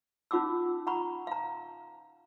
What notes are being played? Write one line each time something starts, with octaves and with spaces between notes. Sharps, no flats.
C#4 D#4 F4 F#5 D6 E6
F#5 A#5 B5 C#6
F5 A#5